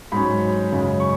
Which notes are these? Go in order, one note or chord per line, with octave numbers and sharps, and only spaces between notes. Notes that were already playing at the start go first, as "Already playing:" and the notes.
G#2 F#3 C#4 B5
F#2 C#3 G#3
C#6